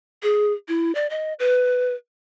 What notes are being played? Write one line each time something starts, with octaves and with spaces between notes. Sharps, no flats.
G#4
E4
D5
D#5
B4